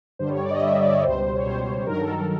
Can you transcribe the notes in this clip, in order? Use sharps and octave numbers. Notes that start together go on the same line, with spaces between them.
G2 D3 G3 C5
C#5
D5
D#5
G2 D3 G3 E5
D5
C#5
C#2 B2 G3 C5
C#5
C#2 B2 G3 C5
G2 D#3 F#3 A#4
A4
A#4